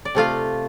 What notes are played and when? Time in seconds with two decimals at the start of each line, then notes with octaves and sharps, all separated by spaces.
0.05 D5
0.15 C3 A3 F4 F5